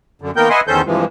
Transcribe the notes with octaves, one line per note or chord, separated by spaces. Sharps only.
F#2 D3
D#3 A#3 B3 A#4 G5 G6
B4 D#5 E5 F#5 G#5 C6
E2 D#3 C#4 A4 C5 G6
G2 C3 E3 F3 G#3